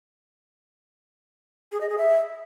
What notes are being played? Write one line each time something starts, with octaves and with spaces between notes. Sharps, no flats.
G#4
D#5
G#4
E5